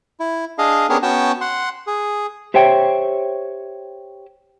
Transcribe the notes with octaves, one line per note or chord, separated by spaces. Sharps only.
E4
D4 G#4 D#5 F5
B3 C#4 D4 G4 G#4 A#4
B3 C#4 F#4 G5 A5
F#5 C6
G#4
G4 C5 C#5 E5 G5